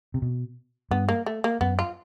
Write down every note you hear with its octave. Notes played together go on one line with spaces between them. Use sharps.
C3
B2
G2 B3
A#3
A3
A#3
F#2 B3
F4